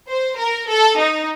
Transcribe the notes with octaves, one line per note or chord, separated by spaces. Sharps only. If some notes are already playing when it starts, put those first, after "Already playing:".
C5
A#4
A4
D#4